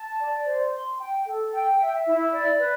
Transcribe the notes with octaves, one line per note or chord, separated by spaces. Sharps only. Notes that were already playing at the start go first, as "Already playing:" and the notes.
Already playing: A5
D5
C5
C6
G5
A4
G5
E5
E4
D5
B4